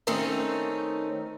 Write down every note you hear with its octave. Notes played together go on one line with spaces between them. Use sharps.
D#3 A3 C4 C#4 D#4